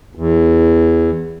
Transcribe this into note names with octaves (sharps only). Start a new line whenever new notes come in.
E2